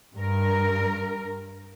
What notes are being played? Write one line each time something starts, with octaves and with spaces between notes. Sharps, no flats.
G2 A#4